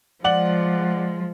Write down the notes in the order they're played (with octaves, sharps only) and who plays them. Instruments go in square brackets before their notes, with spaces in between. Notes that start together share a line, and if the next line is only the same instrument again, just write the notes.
[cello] F3 G#3 [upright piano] D5 F#5 F#7